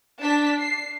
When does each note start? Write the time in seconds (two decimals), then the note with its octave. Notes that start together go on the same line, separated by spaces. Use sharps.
0.21 D4 A5 B6
0.60 C7